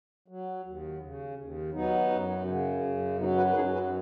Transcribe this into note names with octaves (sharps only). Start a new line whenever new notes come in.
F#3
D#2
C#3
D#2
F#3 B3 D#4
F#2
C#3
F#2
F#3 B3 D#4
F#4 B4
B4
F#2 D#4 G#4
F#4 B4